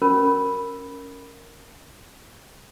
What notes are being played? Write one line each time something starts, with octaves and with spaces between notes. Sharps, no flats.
C#4 A#4 B5